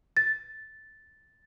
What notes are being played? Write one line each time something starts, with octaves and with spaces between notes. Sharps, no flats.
A6